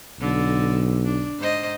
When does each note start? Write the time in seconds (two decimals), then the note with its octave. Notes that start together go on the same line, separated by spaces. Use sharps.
0.20 B1 D3
1.04 D4
1.38 G#2 C5 D#5